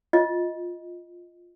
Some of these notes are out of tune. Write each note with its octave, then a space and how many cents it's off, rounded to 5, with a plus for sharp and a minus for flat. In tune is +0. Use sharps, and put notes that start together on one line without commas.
F4 +0 D#5 +10